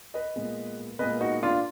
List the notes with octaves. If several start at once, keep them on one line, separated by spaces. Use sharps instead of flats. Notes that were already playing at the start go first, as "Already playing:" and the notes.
B4 D#5
A#2 G#3 B3
A#2 G#3 B3 B4 D#5
D#4 F#4
D4 F4